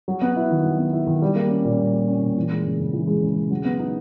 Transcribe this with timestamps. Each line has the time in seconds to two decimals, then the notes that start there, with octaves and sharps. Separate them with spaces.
0.08 F#3
0.22 B3
0.36 E4
0.51 D#3
0.64 F#3
0.78 B3
0.93 E4
1.07 D#3
1.22 G3
1.36 A#3
1.50 C#4
1.65 A#2
1.79 G3
1.94 A#3
2.08 C#4
2.22 A#2
2.37 E3
2.51 G#3
2.65 C#3
2.80 C#3
2.94 E3
3.07 G#3
3.22 C#3
3.36 C#3
3.51 F#3
3.65 B3
3.79 D#4